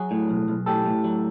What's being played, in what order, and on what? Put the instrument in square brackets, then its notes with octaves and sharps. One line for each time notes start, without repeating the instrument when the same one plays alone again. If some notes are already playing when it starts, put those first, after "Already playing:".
Already playing: [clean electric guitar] F#3 F#4 G#4
A2
B1
B1
A2 G4 A4
A2
F#3